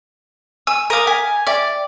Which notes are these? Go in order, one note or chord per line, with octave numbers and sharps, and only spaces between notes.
G#5 E6
A#4 F5 D6 D#6 D#7
G#5 B6
D5 E5 G5